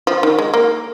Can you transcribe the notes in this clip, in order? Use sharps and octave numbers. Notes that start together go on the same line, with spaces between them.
F3
D#3
G#3
A#3